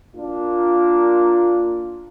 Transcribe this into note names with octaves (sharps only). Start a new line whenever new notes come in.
A#3 D4 F4